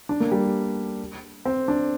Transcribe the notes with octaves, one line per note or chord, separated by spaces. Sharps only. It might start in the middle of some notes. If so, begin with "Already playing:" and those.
D4
A#3
G3
C4
D4